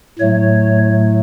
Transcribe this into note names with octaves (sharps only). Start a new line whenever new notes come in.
A2 F#3 A3 C#5